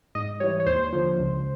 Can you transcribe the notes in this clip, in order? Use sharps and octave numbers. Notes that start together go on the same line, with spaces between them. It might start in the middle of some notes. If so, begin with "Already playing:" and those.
G#2 D#5
E3 G3 C#5
C#5
D#2 C5
D3 F3
C#2